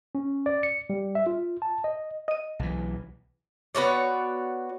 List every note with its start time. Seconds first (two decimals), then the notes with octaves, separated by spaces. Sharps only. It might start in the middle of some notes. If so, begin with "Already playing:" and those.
0.15 C#4
0.46 D5
0.63 C#7
0.90 G3
1.15 E5
1.27 F4
1.62 A5
1.84 D#5
2.28 D#5 D#7
2.59 B1 E3
3.75 B3 F#4 C#5 D5